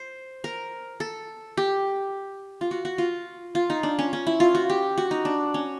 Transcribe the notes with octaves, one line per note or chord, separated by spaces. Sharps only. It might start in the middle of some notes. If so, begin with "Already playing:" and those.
Already playing: C5
A#4
A4
G4
F4
F#4
F#4
F4
F4
D#4
D4
C#4
C#4
E4
F4
F#4
G4
F#4
D#4
D4
C#4